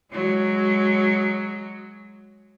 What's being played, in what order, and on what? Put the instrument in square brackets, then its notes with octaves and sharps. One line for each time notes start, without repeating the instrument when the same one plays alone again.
[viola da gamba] F#3 G#3